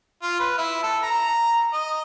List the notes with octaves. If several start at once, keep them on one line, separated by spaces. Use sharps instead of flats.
F4
B4
E4
A4
A#5
D#5